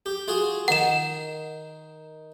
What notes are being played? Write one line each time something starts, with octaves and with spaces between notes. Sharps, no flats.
G4
F4 F#4 G#4
D#3 A#4 F#5 E7